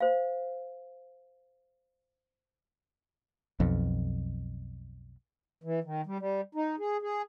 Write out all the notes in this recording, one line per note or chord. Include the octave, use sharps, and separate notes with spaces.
C5 F5
B1 F2
E3
D#3
G3
G3
D#4
G#4
G#4